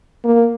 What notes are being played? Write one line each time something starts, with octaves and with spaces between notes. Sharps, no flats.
A#3